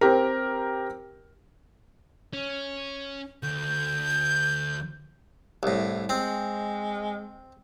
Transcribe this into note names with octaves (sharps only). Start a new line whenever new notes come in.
C4 G4 A#4
C#4
D2 G6
C2 A2
G#3 C4